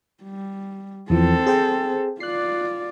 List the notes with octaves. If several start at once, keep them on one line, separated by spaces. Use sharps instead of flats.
G3
E2 E3 F3 C4 A4
G#4 C5 G5
F4 D5 F#6 C7